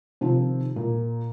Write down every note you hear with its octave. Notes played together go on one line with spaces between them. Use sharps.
C3 D#3 F3 F4
A#2